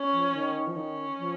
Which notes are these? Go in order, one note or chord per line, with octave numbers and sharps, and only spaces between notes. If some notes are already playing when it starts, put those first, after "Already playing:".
Already playing: C#4
F3
D#3
F3
D#3 C#4
F3